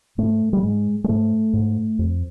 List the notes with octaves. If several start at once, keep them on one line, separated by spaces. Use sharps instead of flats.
G#2 A3
G3
G#2 G#3
G#3
G#2 A3
G#2
F2